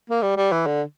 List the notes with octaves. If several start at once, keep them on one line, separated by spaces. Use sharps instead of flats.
A#3
G3
G3
E3
D3